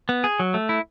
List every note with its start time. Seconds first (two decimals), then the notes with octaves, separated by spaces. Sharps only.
0.09 B3
0.24 G#4
0.39 F#3
0.54 A3
0.69 E4